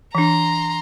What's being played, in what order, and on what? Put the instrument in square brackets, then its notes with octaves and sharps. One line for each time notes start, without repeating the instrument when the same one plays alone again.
[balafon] E3 D4 [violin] A#5 C6